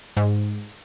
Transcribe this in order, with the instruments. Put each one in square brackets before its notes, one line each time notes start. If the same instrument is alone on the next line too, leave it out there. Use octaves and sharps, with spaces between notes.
[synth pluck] G#2